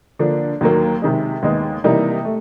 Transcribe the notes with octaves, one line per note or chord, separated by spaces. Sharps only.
D3 F3 A#3 D4
D#2 D#3 F#3 A#3
C3 D#3 G#3
D#2 D#3 G#3 B3
C3 E3 G3 A#3 D#4
A3